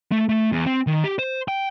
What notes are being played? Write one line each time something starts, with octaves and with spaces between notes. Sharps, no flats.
A3
A3
E2
C4
D#3
G4
C5
G5